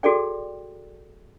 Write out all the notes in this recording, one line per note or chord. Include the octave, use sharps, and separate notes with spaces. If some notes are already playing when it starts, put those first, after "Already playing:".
F#4 G#4 A4 D5 G5